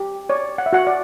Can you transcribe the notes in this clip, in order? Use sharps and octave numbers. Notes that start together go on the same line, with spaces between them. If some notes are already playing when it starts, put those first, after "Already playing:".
Already playing: G4
C#5 D5
F#5
E5
F#4 F#5
D5